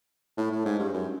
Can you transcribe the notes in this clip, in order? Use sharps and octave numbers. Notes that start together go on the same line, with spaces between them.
A2
A2
G#2
G2
F#2